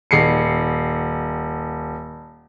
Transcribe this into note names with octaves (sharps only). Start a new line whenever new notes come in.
D#1 C7 C#7